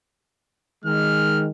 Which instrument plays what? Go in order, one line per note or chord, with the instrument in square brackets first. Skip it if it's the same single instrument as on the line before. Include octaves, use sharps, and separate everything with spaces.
[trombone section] D#3 G#3 [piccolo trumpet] F6